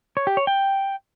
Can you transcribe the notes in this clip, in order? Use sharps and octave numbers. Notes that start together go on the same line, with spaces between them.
C#5
G4
C#5
G5